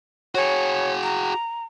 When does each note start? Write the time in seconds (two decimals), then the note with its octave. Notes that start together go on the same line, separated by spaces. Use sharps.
0.35 F#4 G#4 C#5
1.03 A#5